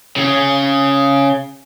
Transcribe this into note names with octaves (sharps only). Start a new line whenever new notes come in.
C#3 G#4